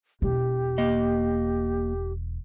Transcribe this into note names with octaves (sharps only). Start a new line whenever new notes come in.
E1 G4
A#3 D#5